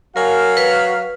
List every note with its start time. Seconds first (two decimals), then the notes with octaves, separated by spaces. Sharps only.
0.16 F#3 F#4 A#4 F5 G#5
0.57 B4